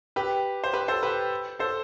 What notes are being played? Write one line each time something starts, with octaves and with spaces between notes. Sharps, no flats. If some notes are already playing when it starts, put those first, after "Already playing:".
G4 B4
C5
G4 B4
A4 C5
G4 B4
A4 C5